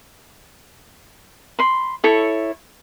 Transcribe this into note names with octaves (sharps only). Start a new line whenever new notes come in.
B5 C6
E4 A4 C#5 C#6